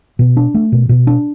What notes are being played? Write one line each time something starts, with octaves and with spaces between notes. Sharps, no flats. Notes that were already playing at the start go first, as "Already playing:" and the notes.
B2
D4
A3
B2
B2
D4